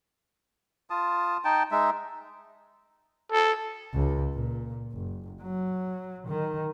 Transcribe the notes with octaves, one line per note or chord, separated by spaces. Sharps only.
F4 A5 D#6
D#4 G5 A5
G#3 D#4 E5
A4
C#2
A#2
F#1
F#3
D#3